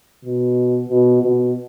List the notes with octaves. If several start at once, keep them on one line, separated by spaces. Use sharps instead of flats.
B2
B2
B2